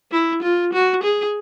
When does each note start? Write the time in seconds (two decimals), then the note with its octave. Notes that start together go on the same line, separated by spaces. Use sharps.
0.11 E4
0.43 F4
0.73 F#4
1.03 G#4